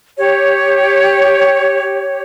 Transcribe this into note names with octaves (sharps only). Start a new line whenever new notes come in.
G4 C#5